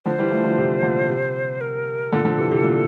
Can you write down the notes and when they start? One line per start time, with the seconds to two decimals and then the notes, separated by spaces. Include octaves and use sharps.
0.05 D3 F3 C5
0.18 E3 G3
0.31 F3 A3
0.44 D3 F3
0.57 C3 E3
0.83 A#2 D3
1.09 C3
1.61 A#4
2.12 A#2 D3 A4
2.25 D3 F3
2.38 C3 E3
2.51 C3 E3
2.63 A#2 D3